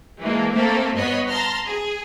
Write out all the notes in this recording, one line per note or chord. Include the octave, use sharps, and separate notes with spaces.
E3 G#3 A#3 D4
A3 A#3 C4 A4 A#4
G2 B3 C#5 D#5 B5 C7
A5 A#5 C6 F6
G#4